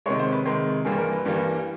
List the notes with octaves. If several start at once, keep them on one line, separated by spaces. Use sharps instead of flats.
C3 D#3 G#3 C#5
C5
B4
C3 D#3 G#3
G2 E3 G3 A#3 G#4
A#4
B4
G2 E3 G3 A#3